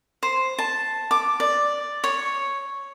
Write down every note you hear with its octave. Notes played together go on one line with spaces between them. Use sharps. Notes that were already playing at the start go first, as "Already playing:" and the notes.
C5
A5
D6
D5
C#5